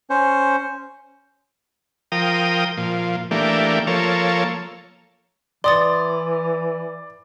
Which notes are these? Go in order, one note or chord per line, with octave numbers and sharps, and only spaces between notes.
C#4 C5
F3 A#4 G5 D#6
A#2 F3
E3 A3 A#3 D4 G4
F3 A#3 A4 C#5
E3 D5 C6 D#6 A6